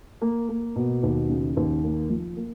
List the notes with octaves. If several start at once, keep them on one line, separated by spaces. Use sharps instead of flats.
A#3
A#3
B2
D#2
C#3
D#2
A#3
F3
A#3